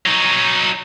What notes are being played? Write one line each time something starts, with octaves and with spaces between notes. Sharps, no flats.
F#3 D#4